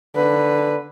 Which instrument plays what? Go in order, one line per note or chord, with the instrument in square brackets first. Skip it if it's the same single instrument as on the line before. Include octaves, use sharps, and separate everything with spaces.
[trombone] D3 [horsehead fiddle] B4